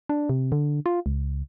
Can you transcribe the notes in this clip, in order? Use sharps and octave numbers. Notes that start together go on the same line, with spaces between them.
D4
C3
D3
F4
C#2